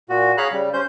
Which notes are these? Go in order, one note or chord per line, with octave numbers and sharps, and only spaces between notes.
A#2 F#4
G#4 C#5 F5 A#5 B5 F#6
C#3 G3
C#4 C5 G6